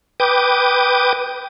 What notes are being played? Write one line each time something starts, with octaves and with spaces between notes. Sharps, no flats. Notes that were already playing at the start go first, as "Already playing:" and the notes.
B4 G5 D6 D#6